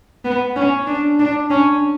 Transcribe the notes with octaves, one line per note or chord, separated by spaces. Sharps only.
B3
C#4
D4
D4
C#4